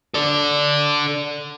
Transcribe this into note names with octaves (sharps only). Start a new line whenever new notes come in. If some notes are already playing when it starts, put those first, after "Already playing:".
A4 D5